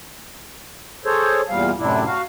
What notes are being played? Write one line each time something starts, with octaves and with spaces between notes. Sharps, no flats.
G#4 A4 C5 C#5
E2 A#2 G3 F5
F#2 A2 C3 D4 E4
F#4 F5